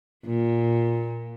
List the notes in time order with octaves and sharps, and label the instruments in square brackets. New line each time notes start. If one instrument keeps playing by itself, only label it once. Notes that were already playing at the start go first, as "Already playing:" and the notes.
[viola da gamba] A#2